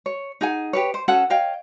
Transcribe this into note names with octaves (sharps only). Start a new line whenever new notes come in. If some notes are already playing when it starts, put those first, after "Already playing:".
C#5
D#4 G#4 F#5 G#5
G4 B4 C#5
C5
C#4 F#4 A4 F#5
C#5 D#5 F5 G5